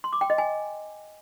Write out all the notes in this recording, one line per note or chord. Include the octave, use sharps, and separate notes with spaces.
C6
D6
G5
D#5
G#5